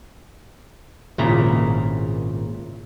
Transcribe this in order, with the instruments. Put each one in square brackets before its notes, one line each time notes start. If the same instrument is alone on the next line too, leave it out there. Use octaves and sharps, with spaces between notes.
[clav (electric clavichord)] G#1 A#2 C#3 E4 A#5